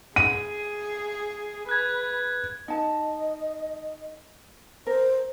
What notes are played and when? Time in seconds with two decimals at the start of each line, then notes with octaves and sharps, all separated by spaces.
0.16 G#4 D#7
1.69 B4 F#6 G#6
2.68 D#4 D#5 A5
4.87 A#4 C5